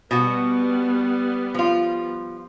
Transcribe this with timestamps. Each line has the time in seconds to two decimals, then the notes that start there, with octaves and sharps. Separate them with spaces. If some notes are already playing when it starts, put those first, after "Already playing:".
0.11 B2 G3 B3 F#4
1.54 F3 F4